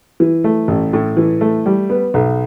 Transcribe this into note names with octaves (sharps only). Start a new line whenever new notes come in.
E3
A3
A1
A2
E3
A3
G3
B3
B1